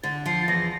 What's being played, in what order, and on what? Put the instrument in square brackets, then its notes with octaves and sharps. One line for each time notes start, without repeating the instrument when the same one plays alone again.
[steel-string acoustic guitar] D3 [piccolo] A6
[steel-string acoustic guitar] F3 [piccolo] C7
[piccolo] A6
[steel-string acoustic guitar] E2 [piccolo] A#6